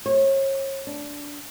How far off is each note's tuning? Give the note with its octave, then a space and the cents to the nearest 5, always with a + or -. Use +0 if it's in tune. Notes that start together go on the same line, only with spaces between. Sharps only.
C#5 -35
D4 -15